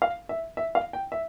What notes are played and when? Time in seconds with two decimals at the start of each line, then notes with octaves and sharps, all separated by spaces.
0.02 F5
0.29 E5
0.57 E5
0.75 F5
0.93 G5
1.12 E5